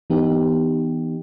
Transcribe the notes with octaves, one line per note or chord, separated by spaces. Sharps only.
E3 B3 D#4 G4